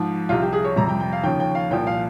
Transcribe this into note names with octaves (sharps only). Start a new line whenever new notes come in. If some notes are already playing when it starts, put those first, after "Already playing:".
Already playing: G#2 F3
C2 C3 F3 F4
G4
G#4
C#5
F2 C3 G3 A#5
G5
G5
F5
D#2 C#3 F3 G5
G5
F5
C2 A#2 F3 G5
F5